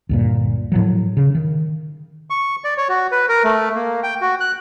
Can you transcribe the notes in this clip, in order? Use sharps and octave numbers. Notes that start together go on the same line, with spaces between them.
D2 G2 A#2
A2 F3 F#3
C#3
D#3
C#6
D5
C#5
F#4
B4
A#4
A3
A#3
G5
F#4
F#6